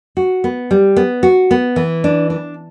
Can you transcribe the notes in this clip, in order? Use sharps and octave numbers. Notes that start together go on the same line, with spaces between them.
F#4
B3
G3
B3
F#4
B3
E3
D4
D4